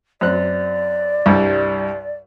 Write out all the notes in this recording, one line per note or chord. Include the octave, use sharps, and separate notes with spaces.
F#2 C4 D5 F#6
C2 G2 G3